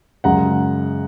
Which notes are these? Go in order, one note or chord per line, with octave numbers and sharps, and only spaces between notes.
F#2 C#3 G#3 F#5 A#5